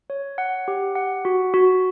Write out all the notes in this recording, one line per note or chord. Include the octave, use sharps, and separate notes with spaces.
C#5
F#5
G4
F#5
F#4
F#4